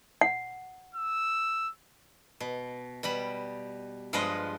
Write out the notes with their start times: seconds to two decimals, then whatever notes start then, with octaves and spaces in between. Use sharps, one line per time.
0.21 F#5
0.95 E6
2.40 B2
3.03 B2 G3 G4 B5
4.13 G2 F3 G#3 F4 B4 D#5